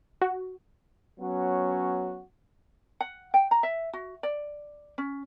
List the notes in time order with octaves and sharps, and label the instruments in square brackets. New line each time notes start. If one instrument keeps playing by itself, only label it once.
[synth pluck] F#4
[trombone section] F#3 B3 C#4 F#4
[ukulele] F#5
G5
A#5
E5
F#4
D5
C#4